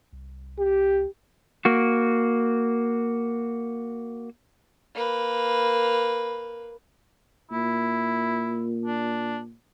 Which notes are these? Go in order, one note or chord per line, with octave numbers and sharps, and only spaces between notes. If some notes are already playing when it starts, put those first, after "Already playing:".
C2
G4
A#3 F#4
A#3 B4
A#2 E4
D4